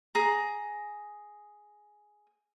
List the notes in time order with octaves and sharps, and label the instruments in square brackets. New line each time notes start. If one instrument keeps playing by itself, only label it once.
[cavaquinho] G#4 A#5